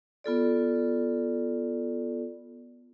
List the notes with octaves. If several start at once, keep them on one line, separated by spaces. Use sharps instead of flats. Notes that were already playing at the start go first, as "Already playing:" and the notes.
B3 F4 A4 D5